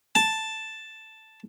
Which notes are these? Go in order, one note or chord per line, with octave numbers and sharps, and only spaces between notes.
A5